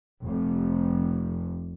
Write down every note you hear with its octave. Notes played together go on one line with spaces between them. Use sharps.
F1 F2 C3